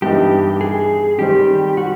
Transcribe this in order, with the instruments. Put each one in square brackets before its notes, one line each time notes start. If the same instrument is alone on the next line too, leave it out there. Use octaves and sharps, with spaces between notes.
[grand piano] G2 E3 G3 B3 D#4 [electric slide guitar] G4
[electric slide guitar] G#4
[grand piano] D#3 G3 C4 [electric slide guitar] G4
[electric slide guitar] F#4